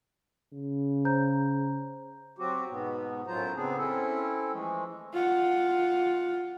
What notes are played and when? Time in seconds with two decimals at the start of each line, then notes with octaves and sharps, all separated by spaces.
0.53 C#3
1.05 C5 A#5 G6
2.38 F#3 C4 F#4 G4
2.69 G#2 B2 B3
3.27 F#2 A2 F#3 F4 C5 A#5
3.56 C#3 B3 C4 D4 G#4
3.77 C4 C#4 E4 A4
4.52 E3 F3 G#3 A3
5.14 F4 F#5